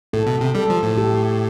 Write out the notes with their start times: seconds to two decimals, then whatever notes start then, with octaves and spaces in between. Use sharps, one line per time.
0.13 A2 A4
0.27 B2
0.41 C3
0.55 G3 A4
0.70 F3
0.83 A2
0.98 G4